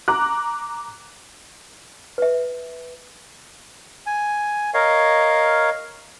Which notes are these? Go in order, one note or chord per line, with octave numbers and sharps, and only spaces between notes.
A#5 D6 F#6
B4 E5
G#5
A#4 C#5 D#5 F5